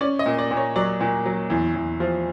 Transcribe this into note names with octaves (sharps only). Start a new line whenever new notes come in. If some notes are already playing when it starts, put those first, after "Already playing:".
C#4 D5
D#5
A#2
D5
A#2
C#5
F#3 D5
A#2
F#3
E2
E2
F3